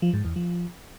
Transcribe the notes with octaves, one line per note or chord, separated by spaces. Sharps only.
F3
G#2
E2
F3